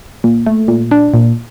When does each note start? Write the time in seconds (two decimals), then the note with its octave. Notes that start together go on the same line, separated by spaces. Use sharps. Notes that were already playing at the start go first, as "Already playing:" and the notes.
0.24 A#2
0.46 A3
0.68 A#2
0.91 D4
1.14 A#2